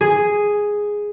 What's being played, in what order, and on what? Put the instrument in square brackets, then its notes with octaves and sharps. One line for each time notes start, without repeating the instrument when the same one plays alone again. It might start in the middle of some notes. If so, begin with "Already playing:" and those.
[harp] G#4